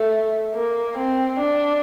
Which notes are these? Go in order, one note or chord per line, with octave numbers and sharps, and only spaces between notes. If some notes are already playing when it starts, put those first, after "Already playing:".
Already playing: A3
A#3
C4
D4